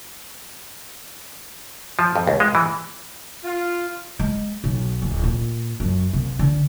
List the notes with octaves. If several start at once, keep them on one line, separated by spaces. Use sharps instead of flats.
F3
F2
C#2
G#3
E3
F4
G#3
B1
D1
A#2
F#2
C2
D3